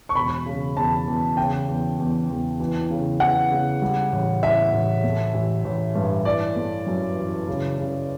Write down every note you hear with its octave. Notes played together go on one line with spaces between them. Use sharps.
C#6
E1 B5
C#3
E2 A5
E2
C#3 G5
E2
E2
E2
E3
C#3
E3 F#5
C#3
G3
A1
A2 E5
A1
A3
A1
A1
G2
E3 D5
A3
F#2
E3
C#3
C#3